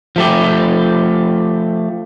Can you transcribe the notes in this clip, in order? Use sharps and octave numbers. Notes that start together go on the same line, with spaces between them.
F3 A3 G4